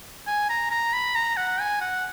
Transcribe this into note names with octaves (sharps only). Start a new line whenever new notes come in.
G#5
A#5
A#5
B5
A#5
F#5
G#5
F#5